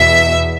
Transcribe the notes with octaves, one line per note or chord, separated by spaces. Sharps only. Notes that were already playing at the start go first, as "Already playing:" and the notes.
Already playing: E2 B2 E5